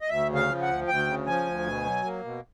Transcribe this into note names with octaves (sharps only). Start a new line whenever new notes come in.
D#5
D2 E5
C#3
F5
F3
F#5
D2
D2 G5
C#3
F3 G#5
D2
B2
F#3
A#3
B2